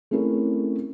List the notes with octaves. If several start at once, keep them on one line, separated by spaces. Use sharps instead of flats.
A3 C4 C#4 E4 G#4 A#4